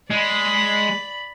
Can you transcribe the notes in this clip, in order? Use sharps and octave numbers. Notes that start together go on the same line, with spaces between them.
G#3 D5 B5